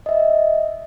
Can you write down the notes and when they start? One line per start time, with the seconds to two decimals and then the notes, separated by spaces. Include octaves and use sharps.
0.06 D#5 E5